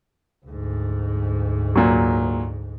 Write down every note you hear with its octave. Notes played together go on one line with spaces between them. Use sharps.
D2 G#2
A#2 F#3